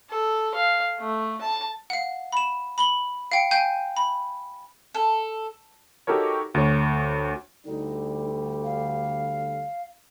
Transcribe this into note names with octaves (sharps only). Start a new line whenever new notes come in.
A4
F5
A3
A5
F5 F#5
B5 E7
B5 F#7 G7
F5 G5 C#7
F5 G5 G#5 G6 D#7
B5
A4
D#4 F#4 G4 A4 A#4 C#5
D2 C#5
D2 D3 G3 D#4
F5